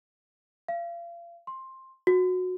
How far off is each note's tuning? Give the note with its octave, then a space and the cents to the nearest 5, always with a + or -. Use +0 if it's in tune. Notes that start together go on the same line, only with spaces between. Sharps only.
F5 -35
C6 +15
F#4 -15